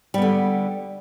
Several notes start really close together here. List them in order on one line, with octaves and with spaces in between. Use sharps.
G3 B3 D3